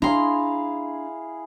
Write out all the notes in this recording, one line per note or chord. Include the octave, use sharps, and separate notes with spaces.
D4 E4 G#4 F5 A#5 C6